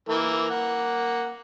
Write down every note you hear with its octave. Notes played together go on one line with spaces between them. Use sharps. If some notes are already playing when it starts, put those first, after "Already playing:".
E3 A#3 A#4
A#3 F#5